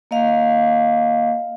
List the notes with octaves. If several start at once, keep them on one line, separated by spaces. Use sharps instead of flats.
A#3 D#5 F5